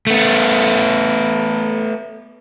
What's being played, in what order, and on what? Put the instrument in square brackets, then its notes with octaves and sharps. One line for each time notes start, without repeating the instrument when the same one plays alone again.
[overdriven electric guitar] A3 B3